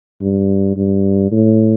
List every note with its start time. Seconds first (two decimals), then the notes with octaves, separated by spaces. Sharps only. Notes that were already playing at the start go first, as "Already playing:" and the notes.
0.21 G2
0.76 G2
1.32 A2